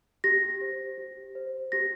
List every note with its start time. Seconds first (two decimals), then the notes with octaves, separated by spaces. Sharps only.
0.24 G4 A#6
0.61 C5
0.98 G4
1.35 C5
1.72 G4 A#6